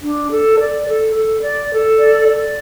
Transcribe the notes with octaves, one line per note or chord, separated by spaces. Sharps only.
D4
A4
D5
A4
A4
D5
A4
D5
D5